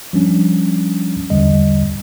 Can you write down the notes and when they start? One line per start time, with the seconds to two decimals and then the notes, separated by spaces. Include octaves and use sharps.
0.13 F3 G3 C#4 D4
1.30 B1 E2 D3 G3 D#5